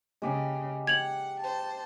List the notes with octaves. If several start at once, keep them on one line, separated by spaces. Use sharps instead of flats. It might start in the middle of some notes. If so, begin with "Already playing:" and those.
C#3 G#3 G4
F#5 G5 G#6 F7 F#7
C5 A5